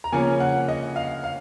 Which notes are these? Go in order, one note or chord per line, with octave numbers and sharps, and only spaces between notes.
A#5
C#3 F3 A#3 C#4 G#5
F#5
D#5
F5
F5